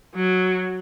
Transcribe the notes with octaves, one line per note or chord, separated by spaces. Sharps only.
F#3